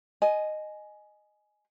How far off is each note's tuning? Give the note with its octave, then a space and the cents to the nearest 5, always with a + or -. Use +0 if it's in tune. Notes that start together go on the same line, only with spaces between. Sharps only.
D#5 -10 G#5 +15